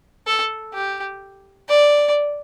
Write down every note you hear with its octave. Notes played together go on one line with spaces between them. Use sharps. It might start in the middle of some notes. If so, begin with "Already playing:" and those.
A4
G4
D5